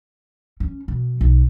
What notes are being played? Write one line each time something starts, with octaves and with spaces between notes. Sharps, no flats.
C#4
B2
B1